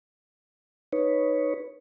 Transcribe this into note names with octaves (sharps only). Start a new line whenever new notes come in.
D#4 B4 C#5